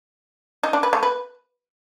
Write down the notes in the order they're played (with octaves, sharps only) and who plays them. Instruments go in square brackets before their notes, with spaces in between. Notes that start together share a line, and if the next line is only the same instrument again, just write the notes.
[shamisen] D#4
D4
B4
A3
B4